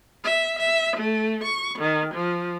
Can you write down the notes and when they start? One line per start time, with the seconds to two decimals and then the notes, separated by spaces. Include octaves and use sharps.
0.24 E5
0.59 E5
0.97 A3
1.43 C#6
1.78 D#3
2.14 F3